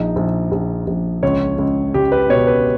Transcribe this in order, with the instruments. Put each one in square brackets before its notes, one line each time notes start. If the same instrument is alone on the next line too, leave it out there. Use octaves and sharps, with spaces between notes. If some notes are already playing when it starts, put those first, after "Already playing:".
Already playing: [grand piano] A#1 D#4
A#1
A#1
A#1
C#2 C#5
C#2
C#2 G4
B4
B2 C#5
B4